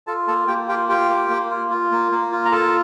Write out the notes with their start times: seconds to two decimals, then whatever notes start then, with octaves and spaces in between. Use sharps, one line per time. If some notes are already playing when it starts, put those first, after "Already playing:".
0.07 F4 A4 A5
0.27 A#3 A4 A5
0.48 A#3 G4 G5
0.68 F4 G4 G5
0.89 F4 G4 G5
1.09 A#3
1.30 A#3
1.50 F4
1.70 F4
1.92 A#3
2.12 A#3
2.32 F4
2.45 A#5
2.52 F4 A4 A5